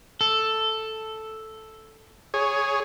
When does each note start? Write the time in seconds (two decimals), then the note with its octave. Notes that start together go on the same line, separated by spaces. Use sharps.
0.21 A4
2.34 G#4 C#5